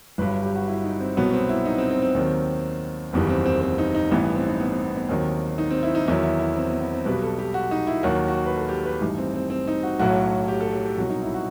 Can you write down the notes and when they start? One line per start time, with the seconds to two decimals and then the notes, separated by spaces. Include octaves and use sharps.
0.18 G1 G2 F#3 B4
0.43 G4
0.55 F#4
0.68 E4
0.84 D#4
1.01 C4
1.17 C2 B2 F#3 B3
1.33 C4
1.49 E4
1.65 D#4
1.78 C4
1.91 C4
2.02 C4
2.15 D#2 D#3 F#3
3.13 F#1 E2 D#3 G3 B3
3.29 C4
3.46 C4
3.62 C4
3.78 D#4
3.95 D#4
4.11 A1 G2 E3 B3
4.23 B3
4.35 C4
4.48 D#4
4.60 B3
4.73 C4
4.84 B3
4.97 B3
5.09 D#2 D#3 F#3 C4
5.58 D#4
5.71 C4
5.83 E4
5.95 D#4
6.08 E2 D#3 F#3 E4
6.24 E4
6.39 E4
6.57 C4
6.69 B3
6.81 B3
6.93 C4
7.05 B1 B2 G3 B4
7.22 A4
7.39 G4
7.54 F#4
7.71 D#4
7.87 E4
8.03 D#2 D#3 F#3 F#4
8.28 F#4
8.46 B4
8.57 A4
8.69 G4
8.85 B4
9.01 A1 G2 E3 G3 D#4
9.18 C4
9.34 C4
9.50 C4
9.67 D#4
9.83 F#4
9.99 B1 A2 F#3 F#4
10.48 G4
10.60 A4
10.73 G4
10.85 G4
10.97 C2 B2 F#3 F#4
11.09 D#4
11.22 E4
11.34 F#4